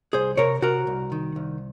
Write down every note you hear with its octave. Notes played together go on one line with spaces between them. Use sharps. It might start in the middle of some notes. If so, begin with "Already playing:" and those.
C2 G#4 C5
C3 A#4 C#5
C3 F#4 A#4
C2
D#3
C2